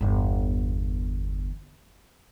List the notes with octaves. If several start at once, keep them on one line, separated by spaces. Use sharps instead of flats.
G1 E2